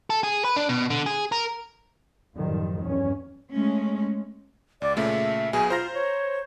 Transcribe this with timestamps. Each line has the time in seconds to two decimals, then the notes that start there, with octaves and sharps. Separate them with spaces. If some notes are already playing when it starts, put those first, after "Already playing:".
0.10 A4
0.23 G#4
0.45 B4
0.56 D4
0.69 B2
0.90 D3
1.06 G#4
1.32 A#4
2.37 F#2 A2 D#3 F3 G3
2.84 E2 G2 C#4
3.50 G#3 A3 C#4
4.82 C#2 D5
4.97 A#2 C#3 A3 E5
5.53 B1 B2 G#4 G#5
5.70 F4 C5 A#5 A#6
5.94 C#5